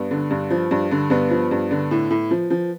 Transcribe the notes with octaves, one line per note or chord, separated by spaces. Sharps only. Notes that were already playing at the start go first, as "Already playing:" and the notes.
Already playing: G2 B3
D3
G2
F3
G2
D3
G2 B3
F3
G2
D3
A2
A2
F3
F3